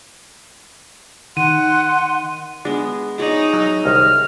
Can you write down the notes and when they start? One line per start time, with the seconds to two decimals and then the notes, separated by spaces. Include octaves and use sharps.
1.37 D#3 F#5 C6 D#7
2.65 G#3 B3 D4
3.19 D#4 G#4 C#5 D5
3.53 F#3
3.86 C2 D#3 F6